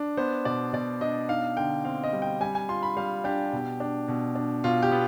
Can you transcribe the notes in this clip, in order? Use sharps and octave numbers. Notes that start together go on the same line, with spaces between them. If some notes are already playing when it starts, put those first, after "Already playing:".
Already playing: D4
B3 C5
B2 D5
B2 D5
D4 D#5
D#4 F5
D3 G5
C4 F5
D#5
G3
G5
G3 G#5
G#5
F4 C6
B5
G3 F5
D4 G4
B2
D4
B2
D4
B2 F4
G4
B3